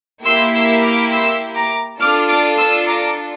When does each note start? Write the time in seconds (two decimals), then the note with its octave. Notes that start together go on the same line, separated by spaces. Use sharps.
0.25 A#3 E4 G4 C6 E6
0.55 C6 E6
0.83 D6 F6
1.12 C6 E6
1.55 A#5 D6
1.99 D4 F4 A4 D6 F6
2.29 D6 F6
2.57 C6 E6
2.86 A#5 D6